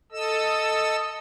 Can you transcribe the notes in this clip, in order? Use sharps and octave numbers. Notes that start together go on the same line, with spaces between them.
A4 D#5 E6